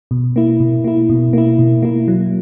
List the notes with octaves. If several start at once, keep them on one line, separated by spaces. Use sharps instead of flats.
B2
A#3 E4
B2
A#3 E4
B2
A#3 E4
B2
A#3 E4
F#3